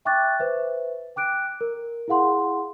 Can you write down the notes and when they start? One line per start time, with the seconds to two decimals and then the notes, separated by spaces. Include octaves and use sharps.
0.05 E5 G5 C#6 D6 F#6 A6
0.39 B4 C5 E5
1.16 G5 D6 F#6 D7
1.61 A#4
2.08 E4 G#4 F5 F#5 C6